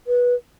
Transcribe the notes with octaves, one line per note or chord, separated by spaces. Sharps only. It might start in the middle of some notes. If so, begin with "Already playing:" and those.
B4